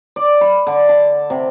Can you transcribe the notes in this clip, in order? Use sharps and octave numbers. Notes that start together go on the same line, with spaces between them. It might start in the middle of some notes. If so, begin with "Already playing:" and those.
D5
B5
D3
A5
C3